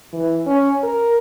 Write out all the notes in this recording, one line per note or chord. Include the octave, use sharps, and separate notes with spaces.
E3
C#4
A#4